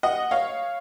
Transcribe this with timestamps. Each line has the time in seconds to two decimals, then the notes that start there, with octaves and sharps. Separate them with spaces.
0.03 D#5 F#5
0.31 C#5 F5